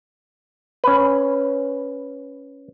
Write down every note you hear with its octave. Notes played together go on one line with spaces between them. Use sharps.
C#4 B4